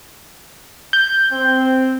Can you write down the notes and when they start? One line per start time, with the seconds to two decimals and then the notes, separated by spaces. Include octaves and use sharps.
0.93 G6
1.33 C4